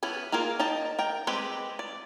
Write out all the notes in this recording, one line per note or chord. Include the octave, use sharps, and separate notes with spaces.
E3 B3 C#4 E4
A#3 F4 G#4 A#4
D#4 D#5 G5 A5
A#4 G5
G#3 C4 G4 B4
D5